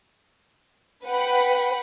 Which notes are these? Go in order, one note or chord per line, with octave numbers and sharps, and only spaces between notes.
B4 F#5 G5 B5